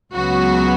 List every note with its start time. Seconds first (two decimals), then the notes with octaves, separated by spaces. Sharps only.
0.13 C#2 C#3 F#3 B3 F#4